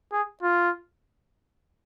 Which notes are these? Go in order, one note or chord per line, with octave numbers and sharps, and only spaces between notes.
G#4
F4